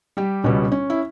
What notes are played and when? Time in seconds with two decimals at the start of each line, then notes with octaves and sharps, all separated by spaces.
0.17 G3 G4
0.44 C#2 B2 G3 B3 C#4
0.72 C#4
0.90 E4